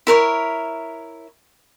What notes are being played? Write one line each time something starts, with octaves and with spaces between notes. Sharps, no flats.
E4 A#4 B4 C#5